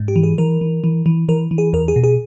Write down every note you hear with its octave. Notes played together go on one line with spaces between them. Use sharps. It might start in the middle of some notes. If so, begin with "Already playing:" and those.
Already playing: G#2
G4
E3
G#4
E3 A#4
E3
E3
E3
E3 A#4
E3
G#4
E2 A#4
G#4
B2
G#4